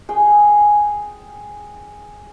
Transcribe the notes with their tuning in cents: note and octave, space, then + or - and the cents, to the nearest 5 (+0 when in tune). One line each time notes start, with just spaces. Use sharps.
G#4 +0 G5 +0